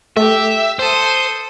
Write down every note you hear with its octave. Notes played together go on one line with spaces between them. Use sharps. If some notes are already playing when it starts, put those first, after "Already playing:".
A3 G4 E5
A4 C5 D#6